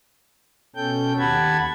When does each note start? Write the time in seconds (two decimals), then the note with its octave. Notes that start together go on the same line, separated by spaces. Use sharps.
0.76 B2 C#4 A4 G5 G6
1.19 D#2 G4 F#5 A5 B5 G#6